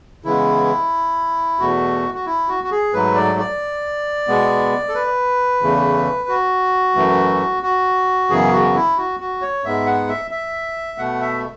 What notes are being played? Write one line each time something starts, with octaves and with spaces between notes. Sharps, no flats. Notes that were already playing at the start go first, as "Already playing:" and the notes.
C#3 E3 G#3 B3 E4
E2 B2 A3 F#4
F#4
E4
F#4
F#4
G#4
G#2 F#3 A3 B4
D5
D5
B2 G#3 B3
A4
B4
E2 C#3 E3 A3
F#4
F#2 E3 A3
F#4
F#2 C#3 E3 B3 G#4
F#4
E4
F#4
F#4
C#5
G#2 G#3 B3 E5
F#5
E5
E5
B2 A3 F#5
E5